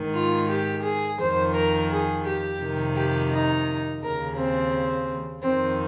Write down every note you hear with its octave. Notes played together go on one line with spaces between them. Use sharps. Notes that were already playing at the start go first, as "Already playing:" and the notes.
Already playing: G#2 D#3
F4
G4
G#4
F2 D#3 C5
A#4
G#4
G4
F2 C3 D#3
G4
D#4
D#2 C#3 A#4
C4
F2 D#3 C4